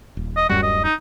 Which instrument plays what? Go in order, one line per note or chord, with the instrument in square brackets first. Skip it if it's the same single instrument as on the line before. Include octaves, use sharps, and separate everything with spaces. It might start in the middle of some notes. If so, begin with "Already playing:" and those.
[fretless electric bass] D#1
[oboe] D#5
[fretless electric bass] D1 F#2 G3 [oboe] F#4
[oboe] D#5
D#4